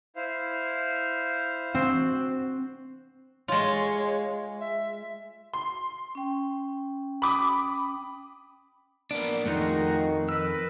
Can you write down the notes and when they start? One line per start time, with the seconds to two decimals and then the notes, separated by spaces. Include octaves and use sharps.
0.16 E4 C5 F5
1.75 C4 F#4
3.48 G#3 F4 C#5
4.60 E5
5.54 C6
6.15 C#4 G5
7.22 B5 D6 D#6
9.11 A#3 B3 D4 D5
9.46 F2 G#2 D#3 A3 D#4 F4 F#4 G#4
10.29 A#4 B4 E6